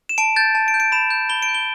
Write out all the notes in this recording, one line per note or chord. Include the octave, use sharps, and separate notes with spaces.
E7
A5 D7
G6 A6
A5
D7
G6
D7
B5 E7
G6
B5 G7
D7
G6
G7